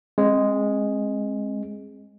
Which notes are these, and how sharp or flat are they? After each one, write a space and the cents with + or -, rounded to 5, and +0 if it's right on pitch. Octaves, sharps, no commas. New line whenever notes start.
G#3 +0 C4 +35